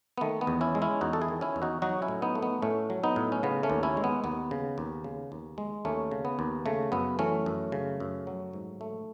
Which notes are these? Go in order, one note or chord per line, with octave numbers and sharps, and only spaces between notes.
B3
D#3 A3
B3
E2
C#4 E4
G#3
C#4 E4
E2 D#4 F#4
A4
E4 G#4
D#3
C#4 E4
E2
D#4 F#4
F#3 D#4 F#4
C#4 E4
A2
B3 D#4
A3
B3 D#4
A2 A3 C#4
F#3
B3 D#4
A2
C#4
C#3 B3
A3 C#4
D#2
C#4 E4
G#3
B3
D#2 B3
C#3
D#2
C#3
D#2
G#3
D#2 A3 C#4
C#3
B3
D#2
C#3 A3
F#2 B3
E3 A3 C#4
F#2
C#3
F#2
F#3
G#2
A3